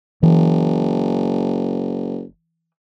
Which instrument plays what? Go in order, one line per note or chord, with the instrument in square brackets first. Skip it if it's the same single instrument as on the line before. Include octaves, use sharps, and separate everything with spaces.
[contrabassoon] F#1 [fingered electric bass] E3